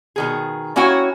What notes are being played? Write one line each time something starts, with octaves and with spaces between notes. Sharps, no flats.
B2 D#3 G#4
A#3 C#4 E4 F#4 C#5 G5